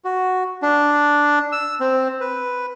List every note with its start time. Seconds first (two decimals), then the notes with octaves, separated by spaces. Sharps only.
0.05 F#4
0.62 D4
1.52 E6
1.80 C4
2.20 B4